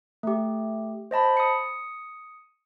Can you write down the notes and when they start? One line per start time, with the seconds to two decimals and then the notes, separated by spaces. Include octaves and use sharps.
0.23 A3 G4
1.11 C5 D#5 A5 B5
1.37 D#6 C#7